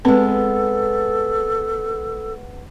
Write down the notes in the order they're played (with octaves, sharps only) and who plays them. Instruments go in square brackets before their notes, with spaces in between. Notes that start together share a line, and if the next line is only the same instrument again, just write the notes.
[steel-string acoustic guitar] G#3 B3 [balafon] C4 B4 [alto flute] A4